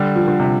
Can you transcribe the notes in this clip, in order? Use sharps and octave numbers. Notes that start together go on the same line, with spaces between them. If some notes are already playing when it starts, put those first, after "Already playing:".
Already playing: D3 G3
F3
D3
C3